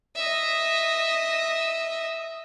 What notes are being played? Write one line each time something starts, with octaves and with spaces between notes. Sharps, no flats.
D#5 E5